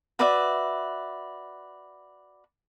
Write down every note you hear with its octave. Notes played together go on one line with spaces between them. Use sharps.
F#4 B4 D5 E5